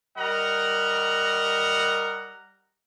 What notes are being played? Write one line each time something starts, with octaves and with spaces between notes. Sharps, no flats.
G3 A#4 D#5 F#5 A#5